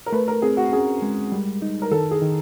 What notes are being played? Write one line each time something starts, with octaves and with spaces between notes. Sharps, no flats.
A#4
A3 B4
A#4
C4 G#4
F#4
C#4 G#4
G#3
G3
D#4
A#4
D#3 A4
G#4
D#3